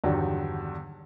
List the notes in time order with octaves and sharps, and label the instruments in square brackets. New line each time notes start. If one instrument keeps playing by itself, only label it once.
[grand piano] E2 G2 D3 D#3 F#3